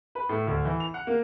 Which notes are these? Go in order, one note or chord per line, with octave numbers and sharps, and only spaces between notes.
B4
A2
D2
E3
F7
F#5
A#3